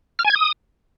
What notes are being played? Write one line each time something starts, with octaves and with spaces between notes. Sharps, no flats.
F6
G#5
G#6
D#6